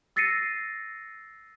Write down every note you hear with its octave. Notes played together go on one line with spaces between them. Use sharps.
E6 A6 A#6 C7 C#7 D#7